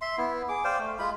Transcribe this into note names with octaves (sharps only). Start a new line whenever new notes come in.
E5 C6
B3 E4
G#4 D6
C5 D5 F5 G5
A3
G#3 F4 B5